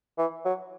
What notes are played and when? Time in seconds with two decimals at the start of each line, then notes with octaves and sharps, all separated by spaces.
0.18 E3
0.45 F#3